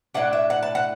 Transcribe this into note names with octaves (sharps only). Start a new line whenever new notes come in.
A2 A3 D4 F#5
E5
F#5
A5
F#5